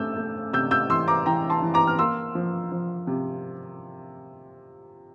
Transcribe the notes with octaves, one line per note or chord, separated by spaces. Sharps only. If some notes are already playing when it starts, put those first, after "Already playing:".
Already playing: A3 E6 G6
A3
C3 E6 G6
E6 G6
E3 C6 E6
A#5 D6
E3 G5 A#5
A5 C6
E3
A#5 D6
F6
A#3 C6 E6
F3
F3
C3